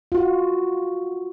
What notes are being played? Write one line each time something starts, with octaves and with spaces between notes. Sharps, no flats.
F4 F#4